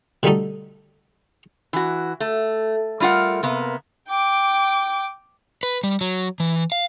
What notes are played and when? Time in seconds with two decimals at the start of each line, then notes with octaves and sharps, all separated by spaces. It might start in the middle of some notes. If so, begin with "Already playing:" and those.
0.23 B2 D3 G3 A3 D#4 A4
1.73 E3 F#4
2.20 A3
3.00 G3 A3 F4 A#4 F#5
3.43 C3 A#3 B3
4.08 G5 D6
5.63 B4
5.84 G3
6.01 F#3
6.40 E3
6.72 F5